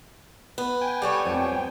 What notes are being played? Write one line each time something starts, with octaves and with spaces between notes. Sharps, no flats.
B3
G5 G#5
G3 A4 C#5
F2